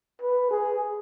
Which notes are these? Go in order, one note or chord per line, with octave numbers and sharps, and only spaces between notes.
B4
G#4